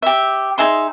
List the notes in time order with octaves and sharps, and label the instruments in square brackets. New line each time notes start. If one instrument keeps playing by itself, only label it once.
[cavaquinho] G4 E5
D#4 G#4 E5 C6